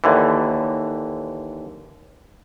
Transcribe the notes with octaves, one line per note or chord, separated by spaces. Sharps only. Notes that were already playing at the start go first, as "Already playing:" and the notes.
D#2 D3 E3